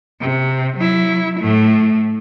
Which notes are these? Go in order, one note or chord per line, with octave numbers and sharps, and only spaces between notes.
C3
F#3 E4
A2 A3